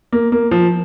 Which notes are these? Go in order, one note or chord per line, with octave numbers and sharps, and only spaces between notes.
A#3
A#3
F3